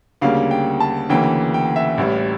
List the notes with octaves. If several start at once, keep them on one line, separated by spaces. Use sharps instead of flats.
D2 C#3 G3 A#3 F5
G5
A5
D2 C#3 E3 A#3 G5
G5
E5
A1 A2 G3